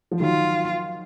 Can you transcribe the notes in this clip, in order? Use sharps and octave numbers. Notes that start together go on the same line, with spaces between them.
F3
D#3 F#3 F4